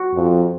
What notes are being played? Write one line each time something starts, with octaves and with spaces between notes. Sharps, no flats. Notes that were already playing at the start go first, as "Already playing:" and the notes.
Already playing: F#4
F2